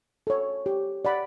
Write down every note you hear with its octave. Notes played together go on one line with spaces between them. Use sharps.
A4 C#5
G4
D5 F#5 B5